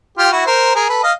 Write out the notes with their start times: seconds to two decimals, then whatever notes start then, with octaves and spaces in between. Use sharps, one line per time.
0.17 F4 G4
0.31 E4 F#4
0.46 A#4 C5
0.75 G#4 A#4
0.89 A4 B4
1.03 D#5 F5